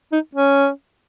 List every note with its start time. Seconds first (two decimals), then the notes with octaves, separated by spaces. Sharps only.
0.12 D#4
0.35 C#4